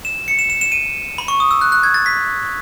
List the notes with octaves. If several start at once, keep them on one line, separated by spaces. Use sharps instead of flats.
E7
C#7
E7
E7
E7
D#7
B5
C#6
D#6
E6
F#6
F#6
G#6
A6
B6